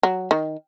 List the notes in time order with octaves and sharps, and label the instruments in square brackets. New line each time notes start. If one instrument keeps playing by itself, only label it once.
[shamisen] F#3
D#3